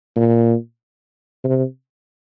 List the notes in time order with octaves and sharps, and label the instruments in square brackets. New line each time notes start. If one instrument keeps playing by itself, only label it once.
[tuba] A#2
C3